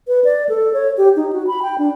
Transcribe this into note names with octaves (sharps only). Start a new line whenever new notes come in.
B4
D5
A4
C#5
G4
D#4
F#4
B5
G5
D4